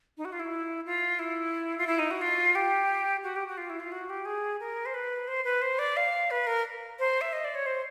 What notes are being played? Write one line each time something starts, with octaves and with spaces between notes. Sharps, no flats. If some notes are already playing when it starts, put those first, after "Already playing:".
D#4
F#4
F4
E4
F4
E4
F4
E4
D#4
F#4
F4
G4
F#4
G4
F#4
F4
E4
F4
F#4
G4
G#4
A#4
C5
B4
C5
B4
C5
D5
F5
B4
A#4
C5
E5
D#5
D5
C#5
C5